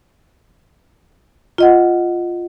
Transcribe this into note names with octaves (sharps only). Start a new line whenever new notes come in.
F4 D#5 F#5